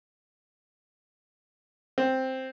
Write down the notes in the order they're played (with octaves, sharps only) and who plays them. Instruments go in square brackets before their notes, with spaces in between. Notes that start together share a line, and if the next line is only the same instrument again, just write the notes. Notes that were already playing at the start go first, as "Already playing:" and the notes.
[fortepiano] C4